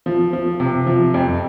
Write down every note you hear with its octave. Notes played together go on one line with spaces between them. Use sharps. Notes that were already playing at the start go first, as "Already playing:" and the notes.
F3
F3
C3
F3
F2